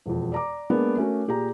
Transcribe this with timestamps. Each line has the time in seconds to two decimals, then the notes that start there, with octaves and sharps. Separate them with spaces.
0.06 E1 F2
0.32 D5 A#5 D6
0.70 G#3 A#3 B3 D4 A#4
0.97 A3 C#4 F#4 A#4
1.28 A#2 G4 G#4 A#5